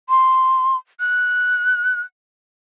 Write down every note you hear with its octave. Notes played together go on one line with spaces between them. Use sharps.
C6
F#6